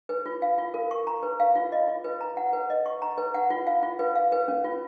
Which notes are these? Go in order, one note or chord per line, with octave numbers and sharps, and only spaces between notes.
B4
F4
F5
F4
A#4
C#6
A#5
B4
F5
F4
D#5
F4
B4
A#5
F#5
B4
D#5
C#6
A#5
B4
F#5
F4
F5
F4
B4
F5
B4
C#4
F4